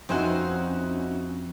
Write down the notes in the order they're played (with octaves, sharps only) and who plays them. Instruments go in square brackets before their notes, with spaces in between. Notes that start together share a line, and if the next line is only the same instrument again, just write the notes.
[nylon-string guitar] F2 C5 G#5 [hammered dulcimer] C4 [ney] C#4 [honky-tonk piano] D#4 E4 F#4